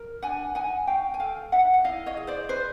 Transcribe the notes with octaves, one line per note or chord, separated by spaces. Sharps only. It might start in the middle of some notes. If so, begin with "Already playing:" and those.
Already playing: A#4
D4 F#5 G#5
D#4 F#5 G#5
F#4 F5 G5
G#5
A4 F5 G5
D#4 E5 F#5
F#5
E4 D#5 F5
C#5 D#5
G#4
C5 D5
B4 C5